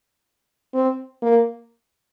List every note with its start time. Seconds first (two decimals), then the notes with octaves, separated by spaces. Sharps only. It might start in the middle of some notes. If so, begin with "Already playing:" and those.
0.74 C4
1.22 A#3